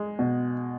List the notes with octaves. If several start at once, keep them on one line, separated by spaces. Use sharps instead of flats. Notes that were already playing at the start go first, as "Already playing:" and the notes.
Already playing: G#3
B2